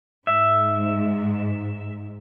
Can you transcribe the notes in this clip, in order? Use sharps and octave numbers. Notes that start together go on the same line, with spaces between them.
G#2 E5